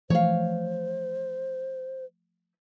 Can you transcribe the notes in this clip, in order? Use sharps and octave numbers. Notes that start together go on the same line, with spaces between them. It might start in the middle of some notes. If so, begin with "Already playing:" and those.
E3 F3 A3 C5 C#5 F5